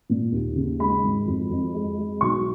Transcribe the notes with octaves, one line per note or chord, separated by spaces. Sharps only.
A#2
D#2
C#3
G#3 B5
G#1
F2
F2
G#3
G#3
B1 C#6